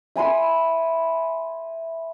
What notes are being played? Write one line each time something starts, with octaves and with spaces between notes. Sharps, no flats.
E5 G#5 B5 C6